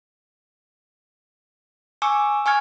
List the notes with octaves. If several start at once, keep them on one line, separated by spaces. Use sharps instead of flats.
G#5 C#6 D6 E6
G#5 C#6 F6 G#6